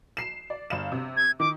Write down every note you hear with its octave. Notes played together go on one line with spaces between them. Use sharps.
C7 E7
D5
G1 F5 E7
C3
G#6
D#3 D6